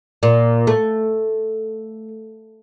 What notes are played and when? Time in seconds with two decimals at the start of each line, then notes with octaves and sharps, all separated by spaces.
0.23 A#2
0.67 A3